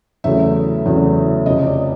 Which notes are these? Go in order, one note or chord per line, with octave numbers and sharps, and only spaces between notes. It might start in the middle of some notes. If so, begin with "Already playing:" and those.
E2 C#3 F#3 A3 E5
E2 C#3 F#3 A3
F1 F2 C#3 D#5
D5